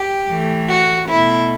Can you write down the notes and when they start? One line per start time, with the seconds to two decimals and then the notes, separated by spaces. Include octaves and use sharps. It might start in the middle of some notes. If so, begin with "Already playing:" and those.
Already playing: G4
0.28 A2 E3 A3
0.69 F#4
1.09 B2 A3 E4